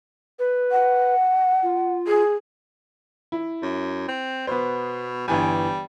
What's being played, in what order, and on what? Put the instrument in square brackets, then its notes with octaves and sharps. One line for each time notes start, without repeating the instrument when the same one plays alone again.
[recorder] B4
[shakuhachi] F#5
[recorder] F4
[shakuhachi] G#4
[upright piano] E4
[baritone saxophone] F#2
C4
[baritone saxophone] B2 [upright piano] B3 C5
[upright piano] G1 E3 G#5 [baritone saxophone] G3